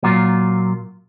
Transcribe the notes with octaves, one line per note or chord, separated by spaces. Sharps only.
A#2 F#3 A#3 F4